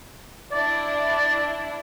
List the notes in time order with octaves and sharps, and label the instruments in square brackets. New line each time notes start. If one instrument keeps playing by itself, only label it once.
[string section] D4 E4 [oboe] D5